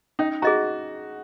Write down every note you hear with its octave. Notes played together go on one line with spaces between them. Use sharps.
C#4 D#4
F#4 G#4 D#5 A#5